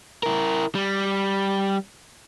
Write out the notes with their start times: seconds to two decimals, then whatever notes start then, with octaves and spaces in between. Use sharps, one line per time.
0.23 E4 A#4
0.75 G3